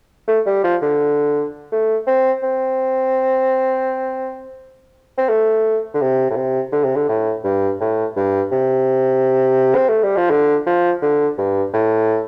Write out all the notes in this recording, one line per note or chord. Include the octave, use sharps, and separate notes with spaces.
A3
G3
F3
D3
A3
C4
C4
C4
A3
D3
C3
A2
C3
D3
C3
D3
A2
G2
A2
G2
C3
C4
A3
G3
F3
D3
F3
D3
G2
A2